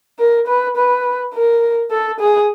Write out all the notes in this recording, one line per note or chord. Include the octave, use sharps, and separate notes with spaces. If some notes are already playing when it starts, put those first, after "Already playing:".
A#4
B4
B4
A#4
A4
G#4